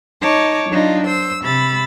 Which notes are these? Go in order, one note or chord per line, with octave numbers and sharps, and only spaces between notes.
D#4 C#5 A5 D6
F#3 D4 D#4 F4
C5 E6
C3 B5 E6 A6